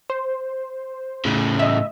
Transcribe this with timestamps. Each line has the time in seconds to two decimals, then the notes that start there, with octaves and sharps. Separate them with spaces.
0.10 C5
1.25 A2 C#3
1.59 D#5 E5